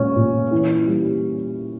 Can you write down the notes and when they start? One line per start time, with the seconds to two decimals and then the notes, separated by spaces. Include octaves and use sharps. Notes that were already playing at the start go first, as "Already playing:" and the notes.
Already playing: A#2 G#3 C#4 C#5
0.16 A#2
0.51 E3
0.87 G3